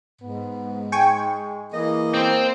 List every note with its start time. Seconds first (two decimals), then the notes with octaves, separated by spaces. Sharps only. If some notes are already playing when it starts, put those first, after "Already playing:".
0.22 G#2 B3
0.92 G#3 G5 G#5 C#6
1.73 E3 A#3 G#4 D#5
2.14 C4 C5